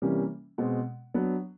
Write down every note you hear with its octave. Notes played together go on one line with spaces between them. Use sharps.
C3 E3 G3 A#3 C#4
B2 G#3 C4
F#3 B3 D4